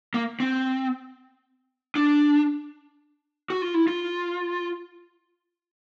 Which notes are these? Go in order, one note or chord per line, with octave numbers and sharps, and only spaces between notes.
A#3
C4
D4
F#4
F4
E4
F4